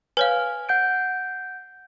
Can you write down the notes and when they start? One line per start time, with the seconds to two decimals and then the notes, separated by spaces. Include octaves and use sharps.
0.17 B4 C#5 F5 G#5 F6
0.69 F#5 G6 D7